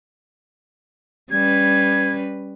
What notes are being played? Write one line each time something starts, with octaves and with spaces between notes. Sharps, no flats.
G3 C#4 B4 G#6